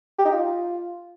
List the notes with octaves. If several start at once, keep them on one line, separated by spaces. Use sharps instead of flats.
G4
D#4
F4